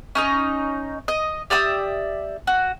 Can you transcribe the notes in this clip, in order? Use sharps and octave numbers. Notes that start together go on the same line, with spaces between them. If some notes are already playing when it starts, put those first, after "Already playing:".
C#4 D#4 D#5
D#5
G4 D5 E5 D#6
F#4